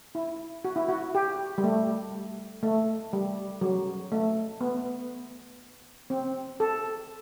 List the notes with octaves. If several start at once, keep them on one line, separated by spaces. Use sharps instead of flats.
E4
F#4
E4
F#4
G4
G3
A3
A3
G3
F#3
A3
B3
C4
A4